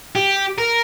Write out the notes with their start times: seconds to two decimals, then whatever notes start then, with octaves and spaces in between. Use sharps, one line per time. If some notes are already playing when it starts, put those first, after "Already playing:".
0.16 G4
0.58 A#4